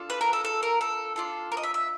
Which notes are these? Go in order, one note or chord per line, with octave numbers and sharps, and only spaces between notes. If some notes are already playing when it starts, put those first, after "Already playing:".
Already playing: D4 F4 A4
B4
A#4
A4
A4
A#4
A4
D4 F4 A4
A#4
D#5
E5
E5